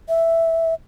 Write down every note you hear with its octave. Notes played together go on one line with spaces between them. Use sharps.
E5